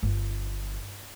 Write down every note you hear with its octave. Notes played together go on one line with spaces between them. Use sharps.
G1